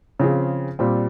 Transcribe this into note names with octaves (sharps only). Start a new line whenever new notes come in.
C#3 F3 C4 F4 G#4
A#2 G3 C4